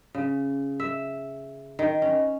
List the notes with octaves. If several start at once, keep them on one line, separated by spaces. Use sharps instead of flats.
C#3
E5
D#3
C#4